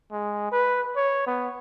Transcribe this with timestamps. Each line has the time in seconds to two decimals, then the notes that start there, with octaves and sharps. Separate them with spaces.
0.12 G#3
0.52 B4
0.96 C#5
1.27 B3